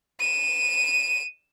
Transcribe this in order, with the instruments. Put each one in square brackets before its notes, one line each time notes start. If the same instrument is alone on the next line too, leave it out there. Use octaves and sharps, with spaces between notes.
[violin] D#7 E7